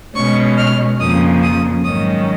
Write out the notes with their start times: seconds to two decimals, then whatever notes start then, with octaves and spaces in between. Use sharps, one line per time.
0.15 B2 G#3 C#4 C#6
0.57 F6
1.00 F2 C#3 F3 A#3 D#6
1.42 D#6
1.85 G#2 D#3 F#3 C#4 D#6